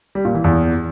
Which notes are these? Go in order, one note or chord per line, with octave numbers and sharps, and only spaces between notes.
G3
A#2
E3
E2